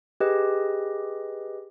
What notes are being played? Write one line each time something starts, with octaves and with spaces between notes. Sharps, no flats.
G4 G#4 B4 D#5